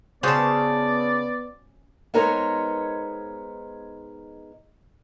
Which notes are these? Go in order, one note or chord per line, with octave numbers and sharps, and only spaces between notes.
C#3 B3 C#4 F#4 C5 D5 A5
G#3 B3 D#4 A#4 C5 C#5